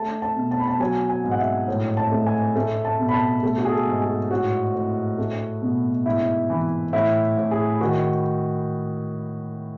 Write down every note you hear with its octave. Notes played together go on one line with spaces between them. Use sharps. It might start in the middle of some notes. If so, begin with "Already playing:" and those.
Already playing: A3 A5
A5
B2
A5
B5
A5
F#3 G#5
G#5
G#2
F#5
E5
A2
A5
A3
G#5
A3
A5
B2
B5
A5
A3
F#4
G#4
A4
G#2
G#4
A2 F#4
A2
A3
B2
G#2 E4
E3
A2 E4
A2
G#4
D#3 F#4